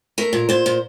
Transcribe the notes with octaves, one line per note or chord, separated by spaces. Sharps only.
A3 A#4
A#2
A#2 C5
A#2